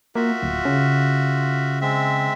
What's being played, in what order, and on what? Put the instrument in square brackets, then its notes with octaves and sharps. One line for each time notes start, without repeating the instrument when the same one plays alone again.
[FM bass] A#3 [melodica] F4 F#4 E5
[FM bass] D1
C#3
[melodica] G#3 C4 E5